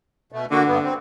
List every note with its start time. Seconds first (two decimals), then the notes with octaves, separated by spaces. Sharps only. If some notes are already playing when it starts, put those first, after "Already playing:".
0.32 B2 A3
0.51 D3 A#3 F#4
0.66 G2 B3
0.83 C4